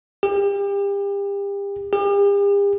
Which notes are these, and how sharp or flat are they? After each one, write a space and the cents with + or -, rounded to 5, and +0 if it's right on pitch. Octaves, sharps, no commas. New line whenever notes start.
G4 +35
G4 +45